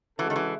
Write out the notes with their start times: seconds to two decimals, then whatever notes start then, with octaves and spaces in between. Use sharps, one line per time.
0.19 C#3 E3 G#3 C#4 F#4 A4
0.30 D#3
0.36 E3